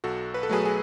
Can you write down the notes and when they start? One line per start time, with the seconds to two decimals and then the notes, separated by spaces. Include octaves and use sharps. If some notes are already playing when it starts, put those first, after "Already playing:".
0.04 B1 F#4 A4
0.34 B4
0.43 A4
0.49 B2 F#3 A3 G#4 B4
0.65 G#4